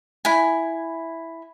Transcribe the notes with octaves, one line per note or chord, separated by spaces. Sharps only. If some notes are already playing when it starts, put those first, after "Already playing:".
E4 G#5